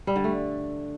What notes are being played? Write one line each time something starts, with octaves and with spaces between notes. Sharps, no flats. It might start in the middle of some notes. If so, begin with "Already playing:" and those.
G3
D3
A3